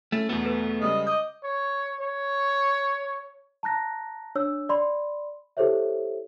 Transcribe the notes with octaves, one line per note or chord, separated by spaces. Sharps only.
A3 C#4 E4 A4
E2 B2 A3 B3
A4 B4
C#3 G3 G#3 D#5
D#5 D6 G6
C#5
C#5
A5 A#5 F#6 A#6
D4 C#5 E6
D5 B5 C6
E4 G4 A4 C5 C#5 E5